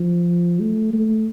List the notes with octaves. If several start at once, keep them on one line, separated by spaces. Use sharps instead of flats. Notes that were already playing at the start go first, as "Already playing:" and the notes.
Already playing: F3
A3
A3